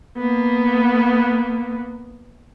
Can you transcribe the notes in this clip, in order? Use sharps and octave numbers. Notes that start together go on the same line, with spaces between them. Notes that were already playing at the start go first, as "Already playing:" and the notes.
A#3 B3